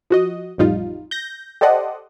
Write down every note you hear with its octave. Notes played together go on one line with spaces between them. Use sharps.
F3 F#4 D#5
A1 F2 G3 D#4 F4
G6 A#6
G4 A4 C5 D5 D#5 F#5